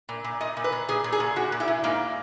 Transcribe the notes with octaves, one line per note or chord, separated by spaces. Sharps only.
A#2
A#2
A#2 D#5
A#2
B4
A#2
A#2 G#4
A#2
G#4
A#2
A#2 F#4
A#2
E4
A#2
G#2 A#3